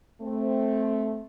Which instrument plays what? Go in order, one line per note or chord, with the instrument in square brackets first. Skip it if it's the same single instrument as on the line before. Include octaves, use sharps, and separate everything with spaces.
[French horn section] A3 C4